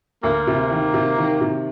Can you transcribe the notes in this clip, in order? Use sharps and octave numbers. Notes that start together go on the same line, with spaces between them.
D2 A#3
C3
D#3
C3
D#3
C3